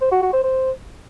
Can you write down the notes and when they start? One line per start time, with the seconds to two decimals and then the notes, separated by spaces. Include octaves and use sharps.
0.01 C5
0.12 F#4
0.22 F#4
0.33 C5
0.44 C5